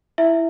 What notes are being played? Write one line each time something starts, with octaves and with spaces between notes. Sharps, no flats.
E4 E5